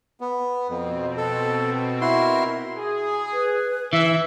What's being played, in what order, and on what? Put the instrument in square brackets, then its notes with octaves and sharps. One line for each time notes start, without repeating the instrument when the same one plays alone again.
[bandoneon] B3
[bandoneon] F2 [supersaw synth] B2 C4
[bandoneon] A4
[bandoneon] E4 F#4 C6 [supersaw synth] A#4
[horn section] G#4
[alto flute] B4
[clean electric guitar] E3 [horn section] E5